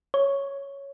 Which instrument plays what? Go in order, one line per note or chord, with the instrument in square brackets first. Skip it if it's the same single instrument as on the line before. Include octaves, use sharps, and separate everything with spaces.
[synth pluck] C#5